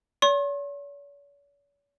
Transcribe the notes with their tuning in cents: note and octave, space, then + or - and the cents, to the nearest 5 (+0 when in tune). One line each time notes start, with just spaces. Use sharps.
C#5 +45 C6 +45